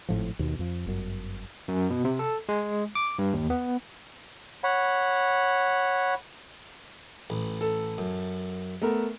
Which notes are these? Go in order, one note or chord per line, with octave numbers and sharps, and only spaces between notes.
G#1 A2 F3
D#2 B2
F2 F3
G1 F#2
F#2
B2
C3
A4
G#3
D6
G2
D#2
B3
C#5 F#5 B5
A1
A4
F#2
A3 B3 A#4